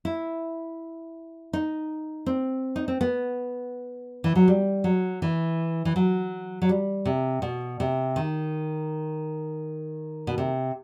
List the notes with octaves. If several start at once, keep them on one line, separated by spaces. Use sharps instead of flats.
E4
D#4
C4
D#4
C4
B3
E3
F#3
G3
F#3
E3
E3
F#3
F#3
G3
C3
B2
C3
D#3
B2
C3